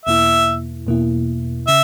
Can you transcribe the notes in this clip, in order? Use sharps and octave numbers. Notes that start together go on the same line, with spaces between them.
E2 B2 A#3 E4 E5
E2 B2 A#3 E4
C#3 E5